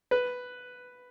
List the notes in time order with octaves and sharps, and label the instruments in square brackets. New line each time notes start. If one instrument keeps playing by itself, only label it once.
[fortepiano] B4